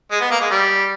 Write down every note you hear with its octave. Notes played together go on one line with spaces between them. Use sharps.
G#3
B3
A#3
G#3
G3